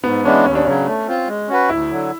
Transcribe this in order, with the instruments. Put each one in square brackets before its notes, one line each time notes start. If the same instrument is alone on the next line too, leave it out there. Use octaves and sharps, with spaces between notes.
[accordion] G#2 [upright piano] B3
[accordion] E3 G#3 B3 D4 [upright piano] C#4
[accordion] D#2 [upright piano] C#4
[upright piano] D4
[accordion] C#3 F#3 [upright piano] C#4
[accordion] A3
C4 F4
G#3
C#4 F#4 B4
[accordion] D2 [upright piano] E4
[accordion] D3 F#3